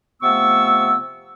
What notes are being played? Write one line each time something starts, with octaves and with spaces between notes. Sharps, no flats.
C3 F3 A3 B3 C#6 E6